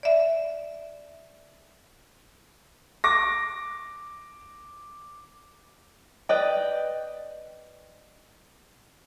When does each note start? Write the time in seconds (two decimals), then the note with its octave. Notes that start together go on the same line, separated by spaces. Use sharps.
0.03 D5 E5
3.04 D6 A#6
6.29 B4 D5 D#5 G5